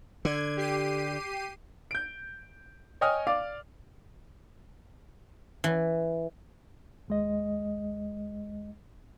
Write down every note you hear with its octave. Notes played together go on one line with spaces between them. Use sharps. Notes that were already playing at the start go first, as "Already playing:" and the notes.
D3 G#6
G4 C7 D#7
G6 D7
C#5 D#5 G5 G#5 D#6 F6
D5 F5 D6
E3
D#2 G#3 D#5